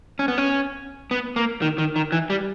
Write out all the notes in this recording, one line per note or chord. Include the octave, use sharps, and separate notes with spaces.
C#4
B3
C#4
B3
A#3
D#3
D#3
D#3
E3
G3